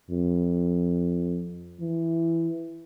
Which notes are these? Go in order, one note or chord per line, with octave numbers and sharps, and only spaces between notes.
F2
E3